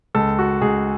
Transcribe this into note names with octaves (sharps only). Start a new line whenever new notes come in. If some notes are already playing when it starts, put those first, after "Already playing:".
C#2 A4
F#4
C#2 G#4